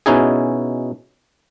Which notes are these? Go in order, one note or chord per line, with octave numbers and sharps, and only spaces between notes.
B2 C#4 D#4 E4 G#4